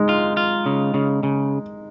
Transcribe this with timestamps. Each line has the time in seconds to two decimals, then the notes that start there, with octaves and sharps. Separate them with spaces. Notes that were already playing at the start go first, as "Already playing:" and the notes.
Already playing: G#3 D#4
0.09 F4
0.37 F4
0.66 C#3
0.94 C#3
1.23 C#3